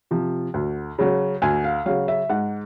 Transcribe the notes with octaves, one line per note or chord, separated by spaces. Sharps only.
C3 F3
D2
C#3 F#3
D2 G#5
F5
C#3 F#3 F5
E5
G#2 F#5